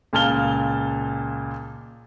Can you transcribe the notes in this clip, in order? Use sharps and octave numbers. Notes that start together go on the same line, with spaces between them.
C#2 A#2 A5 F6 G7